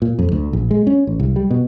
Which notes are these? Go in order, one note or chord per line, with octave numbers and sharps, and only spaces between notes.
A#2
F2
D2
A#1
G#3
C#4
A1
C2
G3
B2